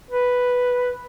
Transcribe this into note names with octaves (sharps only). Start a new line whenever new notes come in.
B4